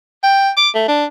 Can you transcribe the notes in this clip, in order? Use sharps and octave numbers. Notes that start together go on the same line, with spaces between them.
G5
D6
A3
D4